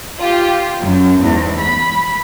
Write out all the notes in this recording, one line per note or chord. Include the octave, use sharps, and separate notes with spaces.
F4 G4
F#2
E2 G#2
B5